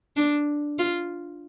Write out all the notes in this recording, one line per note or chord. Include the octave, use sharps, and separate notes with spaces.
D4
F4